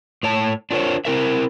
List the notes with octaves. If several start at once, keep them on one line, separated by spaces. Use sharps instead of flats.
A2 C#5 A5
D4 F4 A#4 C5 C#5
C4 E4 A#4 E5